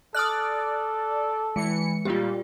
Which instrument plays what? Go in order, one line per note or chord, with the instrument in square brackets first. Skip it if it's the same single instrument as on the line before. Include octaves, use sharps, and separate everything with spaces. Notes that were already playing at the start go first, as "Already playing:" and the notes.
[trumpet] A4 [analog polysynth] D5 [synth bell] D#6 F6 F#6
[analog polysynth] E3 C#7 [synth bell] G#3
[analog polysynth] A#2 G3 [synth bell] F4 G4